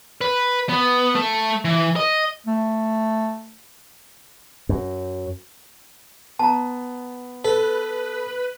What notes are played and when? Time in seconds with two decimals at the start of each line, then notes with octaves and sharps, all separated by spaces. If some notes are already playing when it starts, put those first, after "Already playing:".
0.21 B4
0.69 B3
1.15 A3 A4
1.65 E3
1.96 D#5
2.46 A3
4.69 F#2
6.39 B3 A5 A#5
7.44 A4 B4